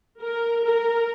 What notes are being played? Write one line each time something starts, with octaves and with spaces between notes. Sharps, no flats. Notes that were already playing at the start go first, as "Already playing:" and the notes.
A#4
A#4